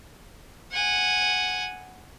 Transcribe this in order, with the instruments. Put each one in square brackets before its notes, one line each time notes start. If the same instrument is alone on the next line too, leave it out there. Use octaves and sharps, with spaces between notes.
[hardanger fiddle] F#5 G#5